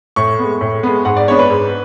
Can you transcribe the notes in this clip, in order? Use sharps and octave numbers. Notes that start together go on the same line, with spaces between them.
A2 C#6
G#3 B3
A2
G#3 B3
G#2 F#5
D5
G#3 B3 D4 C#5
B4
G#2